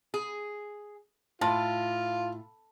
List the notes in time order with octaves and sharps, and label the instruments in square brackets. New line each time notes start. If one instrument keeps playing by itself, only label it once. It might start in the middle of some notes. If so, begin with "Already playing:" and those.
[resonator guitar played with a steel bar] G#4
[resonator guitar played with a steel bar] A2 [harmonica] F4 [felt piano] A5 C6